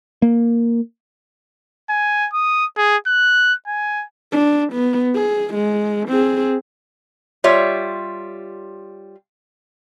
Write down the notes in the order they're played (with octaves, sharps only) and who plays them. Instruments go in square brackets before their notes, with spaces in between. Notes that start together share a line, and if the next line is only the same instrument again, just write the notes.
[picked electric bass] A#3
[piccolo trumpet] G#5
D#6
G#4
F#6
G#5
[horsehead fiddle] D4
B3
G#4
G#3
C4 G#4
[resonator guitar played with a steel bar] G3 F4 C#5 E5